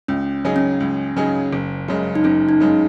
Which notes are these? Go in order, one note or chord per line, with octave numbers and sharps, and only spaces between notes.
C#2 C#4
C#3 F#3 D#4 G#4
C#4
C#2
C#3 F#3 D#4 G#4
F#1
F#2 C#3 G#3
D#4
F#1 C#4
D#4
F#2 C#3 G#3